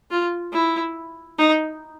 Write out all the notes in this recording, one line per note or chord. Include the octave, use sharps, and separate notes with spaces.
F4
E4
D#4